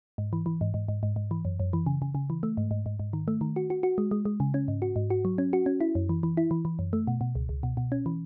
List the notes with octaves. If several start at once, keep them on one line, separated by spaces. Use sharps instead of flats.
G#2
E3
E3
G#2
G#2
G#2
G#2
G#2
E3
F#2
F#2
E3
C#3
C#3
C#3
E3
A3
G#2
G#2
G#2
G#2
D#3
A3
D#3
F#4
F#4
F#4
G#3
G#3
G#3
C#3
C#4
G#2
F#4
G#2
F#4
F#3
C#4
F#4
C#4
E4
F#2
E3
E3
E4
E3
E3
F#2
A3
B2
B2
C#2
C#2
B2
B2
C#4
E3